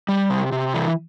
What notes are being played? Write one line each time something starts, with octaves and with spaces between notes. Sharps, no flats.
G3
C3
C3
E3